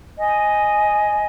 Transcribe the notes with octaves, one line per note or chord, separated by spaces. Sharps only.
D#5 G#5